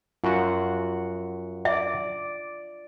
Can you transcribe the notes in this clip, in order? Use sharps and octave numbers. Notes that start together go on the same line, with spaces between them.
F#2 F4 F#4 F#5
D5 E5